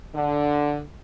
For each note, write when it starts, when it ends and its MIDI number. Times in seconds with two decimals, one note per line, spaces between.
0.15 0.80 50